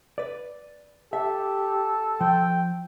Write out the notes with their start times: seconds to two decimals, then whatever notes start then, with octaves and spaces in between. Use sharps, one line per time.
0.18 B4 D5
1.13 G4 A4 E5
2.21 F3 G5